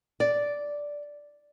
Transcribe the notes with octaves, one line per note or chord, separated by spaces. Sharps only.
D5